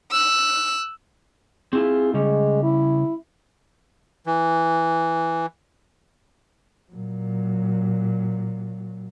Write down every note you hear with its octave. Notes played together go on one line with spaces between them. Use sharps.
E6 F#6
C4 E4 F4 G#4
C#3 G3 G#3 C#4
E4
E3
A#2 F#3